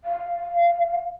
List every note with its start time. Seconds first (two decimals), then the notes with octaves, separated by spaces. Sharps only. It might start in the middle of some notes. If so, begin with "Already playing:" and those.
0.04 F5